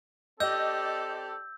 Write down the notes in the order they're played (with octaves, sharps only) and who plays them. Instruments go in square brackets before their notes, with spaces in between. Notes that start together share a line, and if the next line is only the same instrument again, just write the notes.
[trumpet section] C4 A4 [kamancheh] G4 D5 [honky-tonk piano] D#5 [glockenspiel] E6 G6